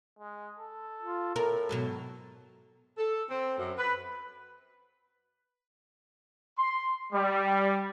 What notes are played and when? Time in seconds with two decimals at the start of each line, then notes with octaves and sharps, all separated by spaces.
0.19 G#3
0.59 A4
1.02 F4
1.36 A2 A4 A#4
1.69 G#2 B2 F#3
2.98 A4
3.30 C4
3.58 F#2
3.78 B4
6.59 C6
7.13 G3